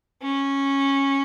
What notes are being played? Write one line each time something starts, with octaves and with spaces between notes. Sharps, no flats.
C#4